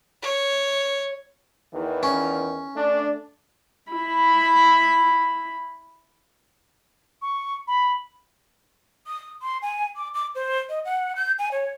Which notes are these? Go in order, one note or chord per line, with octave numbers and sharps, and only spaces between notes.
C#5
E2 D#3 E3
C#4
A3 D4
E4 B5
C#6
B5
D#6
C6
G#5
D6
D6
C5
D#5
F#5
G6
G#5
C#5